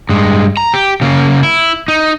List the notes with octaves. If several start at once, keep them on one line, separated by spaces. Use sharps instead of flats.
G2 G#3
A#5
G4
C#3 A#3
E4
D#4